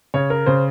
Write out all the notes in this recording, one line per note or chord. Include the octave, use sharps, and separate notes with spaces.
C#3 C#5
A#4
C#3 C5